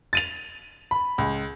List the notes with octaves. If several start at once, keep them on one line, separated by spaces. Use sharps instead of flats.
A6 D#7 F7
B5
C#2